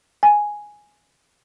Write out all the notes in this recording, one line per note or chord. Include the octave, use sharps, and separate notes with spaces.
G#5